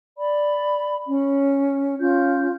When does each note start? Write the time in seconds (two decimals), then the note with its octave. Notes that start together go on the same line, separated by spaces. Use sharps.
0.18 D5 B5
1.07 C#4
2.00 C#4 F4 G6